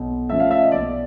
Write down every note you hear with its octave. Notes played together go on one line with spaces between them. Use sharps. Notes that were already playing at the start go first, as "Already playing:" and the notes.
Already playing: B1
A#2 F3 A3 C#4 E5
F5
E5
D#5
B1 D5